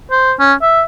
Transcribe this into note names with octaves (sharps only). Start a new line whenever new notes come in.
C5
C#4
E5